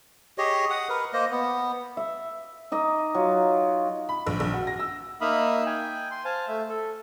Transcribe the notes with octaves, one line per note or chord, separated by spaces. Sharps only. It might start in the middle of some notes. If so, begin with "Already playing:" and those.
G4 G#4 C#5 D#5
F#5 D#6
A#4 B4
A#3 C5 D#5
B3
E5
D#4 D#5 D6
F#3 F4
B5
A#1
A#1
F#4
A#6
E6
A#3 D#4 E5 F5 B5 D#6
G5 G#5
C6
C5 F5 G#5 A5
A3 E5
A4